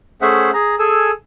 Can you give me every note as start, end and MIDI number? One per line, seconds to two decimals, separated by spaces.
0.22 0.51 57
0.22 0.51 61
0.22 0.51 68
0.22 0.51 72
0.22 0.51 76
0.22 0.51 78
0.54 0.75 68
0.54 0.75 82
0.79 1.11 68
0.79 1.11 69
0.79 1.11 80
0.79 1.11 88